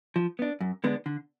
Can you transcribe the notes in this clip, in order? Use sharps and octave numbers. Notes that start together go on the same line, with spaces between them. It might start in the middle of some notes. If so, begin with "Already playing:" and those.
F3
B3 D4
F#2
D3 G#3 B3 D4
D3